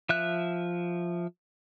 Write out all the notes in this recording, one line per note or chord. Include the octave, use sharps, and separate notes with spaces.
F3 E5 F#6